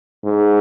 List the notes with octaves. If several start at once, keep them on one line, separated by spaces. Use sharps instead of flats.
G#2